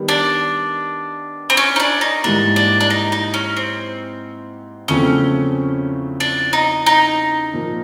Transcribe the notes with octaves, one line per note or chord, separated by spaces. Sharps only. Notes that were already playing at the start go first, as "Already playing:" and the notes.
Already playing: D#3 G3 B3
D4
C4
C#4
D#4
D4
D#4
G#2 E3 G3 A#3 D4
D4
D4
D#4
D#4
C#4
C4
E2 C#3 F3 A3 C4 C#4
D4
D#4
D#4
A#2 F3 A#3